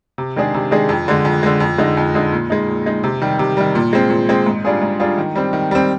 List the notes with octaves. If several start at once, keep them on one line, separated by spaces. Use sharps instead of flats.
C3
D#3 G#3 D4 G#4
C3
D#3 G#3 D4 G#4
F2
D3 G#3
F2
D3 G#3
F2
D3 G#3 D#4
F2
D3 G#3 D#4
A#2
G#3 D#4
A#2
G#3 D#4
C3
D#3 G3
C3
D#3 G3
A#2
G#3 C4
A#2
G#3 C4
G#2
G3 D4 F4 G#4
G#2
G3 D4 F4 G#4
D#3
G3 C4
D#3
G3 C4